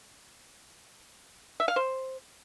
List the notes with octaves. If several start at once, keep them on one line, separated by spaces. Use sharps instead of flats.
E5
F5
C5